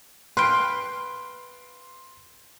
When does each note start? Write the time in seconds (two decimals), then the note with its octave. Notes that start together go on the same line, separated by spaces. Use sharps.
0.37 B4 F5 G5 C6